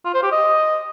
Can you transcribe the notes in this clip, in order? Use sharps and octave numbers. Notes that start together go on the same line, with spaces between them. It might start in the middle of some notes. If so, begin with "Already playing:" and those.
F4
C5
G4
D#5